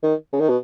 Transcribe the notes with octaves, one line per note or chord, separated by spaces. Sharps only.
D#3
C#3
D#3
B2